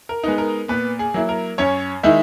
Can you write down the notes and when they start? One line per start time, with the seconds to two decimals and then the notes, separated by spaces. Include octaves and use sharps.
0.09 A#4
0.23 G#3 B3 D#4
0.38 A#4
0.68 A#2 B3 B4
0.99 G#4
1.14 F#3 A#3 E4
1.29 A#4
1.58 F#2 C#4 C#5
2.03 D#3 G#3 D#4 E4 E5